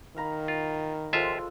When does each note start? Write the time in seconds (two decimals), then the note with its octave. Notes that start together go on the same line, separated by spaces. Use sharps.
0.16 D#3 F5 A#5 B5
0.48 F4
1.13 D#2 F3 G#3 F4 A4 E5